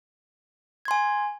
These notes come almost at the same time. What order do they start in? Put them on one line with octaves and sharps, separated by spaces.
G#6 C6 G#5